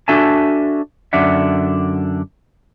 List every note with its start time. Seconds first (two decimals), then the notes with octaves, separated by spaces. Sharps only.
0.08 D4 F#4 A4 E5 G#5 A5
1.13 F#2 D3 D4 E5 F#5